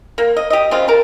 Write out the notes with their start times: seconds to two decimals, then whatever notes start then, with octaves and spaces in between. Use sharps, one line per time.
0.18 A#3
0.37 D#5
0.50 G4 D#5
0.71 C#3 C4 F4
0.88 A#4 A5